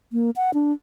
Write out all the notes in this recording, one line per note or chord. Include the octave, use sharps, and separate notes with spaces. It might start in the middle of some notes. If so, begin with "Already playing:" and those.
A#3
F#5
D4